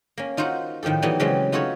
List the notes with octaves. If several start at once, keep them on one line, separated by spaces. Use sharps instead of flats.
A#3 C#4
D#4 F4 F#4 C5 F#5
A2 D#3 F3 G4 A4
E3 F#3 G3 A3 B3 D#4
C#3 E3 F#3 G#3 A3 C4
D#4 F4 F#4 A4 C#5 E5